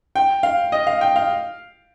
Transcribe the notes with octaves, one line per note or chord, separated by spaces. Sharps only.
G5
F5
D#5
F5
G5
F5